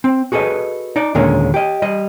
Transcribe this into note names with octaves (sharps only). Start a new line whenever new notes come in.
C4
F#4 G#4 A4 B4 D#5
D#4 D5
D#2 A#2 D3 G#3 A#3 C#4
G4 D#5
G3 D#5